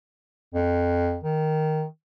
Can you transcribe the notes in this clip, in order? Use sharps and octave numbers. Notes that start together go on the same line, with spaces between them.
F2
D#3